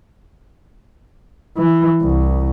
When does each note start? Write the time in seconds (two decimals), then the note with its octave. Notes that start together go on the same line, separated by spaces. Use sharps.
1.57 E3
2.02 C2